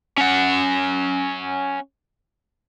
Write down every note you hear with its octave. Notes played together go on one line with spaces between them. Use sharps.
C#4 F#5